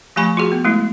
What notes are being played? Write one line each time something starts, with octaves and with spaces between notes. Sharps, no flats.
F3 A3 G4 G#5 B5 C#6
F4 F#4 G#4
B3
G#3 A3 E4